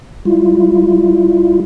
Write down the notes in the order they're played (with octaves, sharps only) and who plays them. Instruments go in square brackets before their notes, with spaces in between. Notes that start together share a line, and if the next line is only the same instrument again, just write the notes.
[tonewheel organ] G3 E4 F4